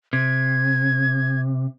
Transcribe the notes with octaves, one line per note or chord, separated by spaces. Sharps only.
C3 G#6